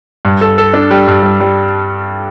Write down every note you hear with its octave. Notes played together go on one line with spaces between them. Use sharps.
G2
A4
A4
D4
G3
G2
G3
G3